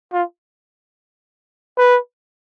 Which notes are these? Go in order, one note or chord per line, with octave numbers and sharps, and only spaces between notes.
F4
B4